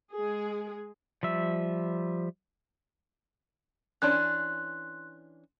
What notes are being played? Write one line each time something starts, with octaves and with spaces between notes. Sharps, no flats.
G#3 G#4
F3 G3 E5
E3 C#4 D4 C6 F#6